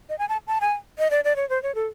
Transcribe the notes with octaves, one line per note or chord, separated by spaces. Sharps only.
D#5
G#5
A5
A5
G#5
D#5
D5
D5
C#5
C5
C#5
A4